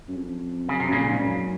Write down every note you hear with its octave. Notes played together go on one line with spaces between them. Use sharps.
F#2
F2
F#2 C#3
C3
F#2
F2 A#2 C#3
G#2
F#2